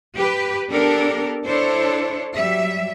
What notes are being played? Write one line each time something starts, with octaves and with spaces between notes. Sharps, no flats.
G4 B4
B3 D4 G4 A4 A#4
D4 E4 A4 C5 C#5
F#3 G3 E5